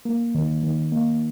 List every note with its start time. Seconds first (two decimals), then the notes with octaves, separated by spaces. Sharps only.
0.05 A#3
0.35 D#3
0.63 D#3
0.92 A#3